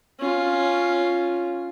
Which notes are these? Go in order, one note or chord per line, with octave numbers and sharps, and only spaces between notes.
C#4 F4